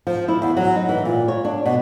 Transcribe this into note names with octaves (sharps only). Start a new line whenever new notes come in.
F3
E4
E2
F#3
D#4
E3
A#2
C#5
D4
B2